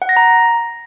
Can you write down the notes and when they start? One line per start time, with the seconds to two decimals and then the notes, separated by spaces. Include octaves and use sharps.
0.02 F#5
0.09 A#6
0.17 A#5